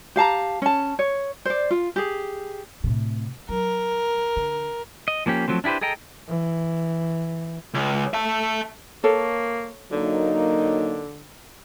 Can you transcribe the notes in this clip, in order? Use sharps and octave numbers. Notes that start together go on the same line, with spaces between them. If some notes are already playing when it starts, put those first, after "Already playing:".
G4 F5 A5 A#5
C#4 A5
C#5
C5 D5
F4
G4 G#4
A2 C3
F#3 A#4
D3
D#5
F3 A#3 C#4 G4
F3 F#3 A3 C4
D4 E4 G4 B4 C5
G#4 A4 D#5 G5 A#5
E3
C#2
E5 A5
A#3 A4 C#5
D3 F#3 A#3 D#4